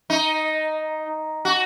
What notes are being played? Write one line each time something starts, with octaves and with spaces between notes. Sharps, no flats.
D#4
F#4